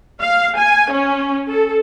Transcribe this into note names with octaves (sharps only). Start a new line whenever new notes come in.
F5
G#5
C#4
A4